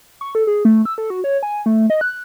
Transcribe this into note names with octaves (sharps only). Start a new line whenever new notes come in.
C#6
A4
G#4
A3
E6
A4
F#4
C#5
G#5
A3
D#5
F#6